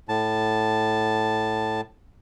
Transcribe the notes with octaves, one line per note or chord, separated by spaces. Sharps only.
A2 A5